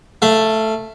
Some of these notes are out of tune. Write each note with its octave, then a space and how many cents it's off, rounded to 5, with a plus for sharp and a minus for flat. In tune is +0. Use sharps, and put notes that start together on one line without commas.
A3 +0 F5 -25